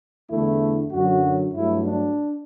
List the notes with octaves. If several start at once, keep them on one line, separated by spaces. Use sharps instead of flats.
E2 D3 A3 E4
F#2 D3 F#3 F#4
G2 F#3 A3 E4
D4